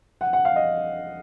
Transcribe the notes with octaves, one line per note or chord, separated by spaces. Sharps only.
F#5
F#5
F5
D#5